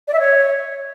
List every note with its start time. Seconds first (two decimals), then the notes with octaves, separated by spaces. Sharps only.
0.08 D5
0.13 E5
0.19 C#5